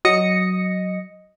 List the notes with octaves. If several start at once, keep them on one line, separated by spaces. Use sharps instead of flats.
F#3 D#5 D#6 A#6 C#7